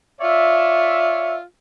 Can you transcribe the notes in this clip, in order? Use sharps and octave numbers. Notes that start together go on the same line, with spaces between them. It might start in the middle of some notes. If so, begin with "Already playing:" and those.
F4 C#5 D5 E5